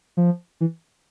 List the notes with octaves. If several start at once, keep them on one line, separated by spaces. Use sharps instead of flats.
F3
E3